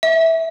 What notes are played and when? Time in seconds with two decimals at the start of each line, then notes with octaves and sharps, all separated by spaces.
0.03 E5